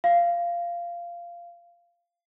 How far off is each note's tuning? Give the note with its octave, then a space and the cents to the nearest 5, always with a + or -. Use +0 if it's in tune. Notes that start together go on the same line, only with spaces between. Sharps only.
F5 -15